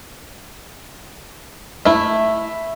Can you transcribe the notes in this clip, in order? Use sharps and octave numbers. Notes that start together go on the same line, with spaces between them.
A3 E4 E5